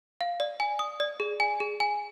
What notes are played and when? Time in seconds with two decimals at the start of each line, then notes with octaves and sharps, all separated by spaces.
0.21 F5
0.40 D5
0.60 G#5
0.79 D#6
1.00 D5
1.20 G#4
1.40 G#5
1.60 G#4
1.80 G#5